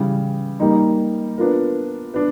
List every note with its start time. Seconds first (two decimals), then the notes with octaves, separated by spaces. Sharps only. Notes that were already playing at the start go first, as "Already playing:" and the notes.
Already playing: C#3 E3 G3
0.60 G3 A#3 D#4
1.38 B3 D4 F4 A#4
2.14 B3 D4